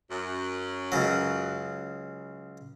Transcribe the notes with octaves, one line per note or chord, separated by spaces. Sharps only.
F#2
C#2 C#3 F#3